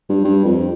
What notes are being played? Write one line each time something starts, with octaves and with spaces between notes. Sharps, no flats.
G2
G2
F2